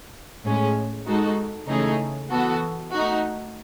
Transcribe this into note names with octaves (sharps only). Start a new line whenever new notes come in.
A2 G#3 C#4
G#3 D#4 F#4 A4
C#3 E3 A3 D#4 G#4
E3 B3 F#4 A4
A3 D#4 F#4